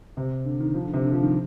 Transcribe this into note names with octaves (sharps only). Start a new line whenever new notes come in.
C3
D3
D#3
F3
D3
C3
D3
F3
D#3